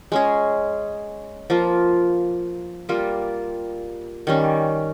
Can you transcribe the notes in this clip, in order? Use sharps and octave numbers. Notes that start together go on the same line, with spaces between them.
G#3 C#4 G#4
F3 A#3 F4
G3 A#3 F4
D#3 G3 C#4